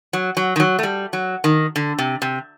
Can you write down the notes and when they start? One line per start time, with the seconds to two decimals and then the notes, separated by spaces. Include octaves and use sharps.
0.13 F#3
0.37 F#3
0.56 D#3
0.60 F#3
0.79 A3
0.83 G3
1.13 F#3
1.44 D#3
1.76 D3
1.99 C3
2.22 C3